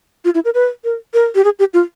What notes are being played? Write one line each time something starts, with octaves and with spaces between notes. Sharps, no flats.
F4
E4
A#4
B4
A#4
A#4
G4
G#4
G4
F4